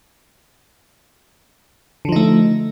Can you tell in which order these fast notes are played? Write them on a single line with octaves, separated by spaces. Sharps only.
D3 F3 D#4 A3